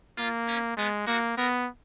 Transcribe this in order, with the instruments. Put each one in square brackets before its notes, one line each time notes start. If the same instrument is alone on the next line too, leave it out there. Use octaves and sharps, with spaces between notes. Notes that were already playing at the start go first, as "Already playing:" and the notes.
[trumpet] A#3 [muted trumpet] F4
[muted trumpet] C#4
[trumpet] G#3 [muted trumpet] B3
[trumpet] A#3 [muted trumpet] F#4
[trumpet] B3 [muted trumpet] A#4